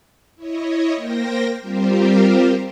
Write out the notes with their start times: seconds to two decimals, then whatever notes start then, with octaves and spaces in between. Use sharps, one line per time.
0.36 E4 C#5 D#5
0.96 A#3 A#4 C5 G5 A#6
1.61 G3 C4 F4 G4 A#4 C5